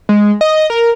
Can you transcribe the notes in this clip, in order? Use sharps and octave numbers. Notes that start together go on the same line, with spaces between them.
G#3
D#5
A#4